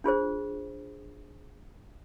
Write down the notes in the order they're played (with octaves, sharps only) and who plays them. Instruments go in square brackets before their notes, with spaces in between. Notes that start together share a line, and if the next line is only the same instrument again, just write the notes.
[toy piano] D4 F4 G#4 C5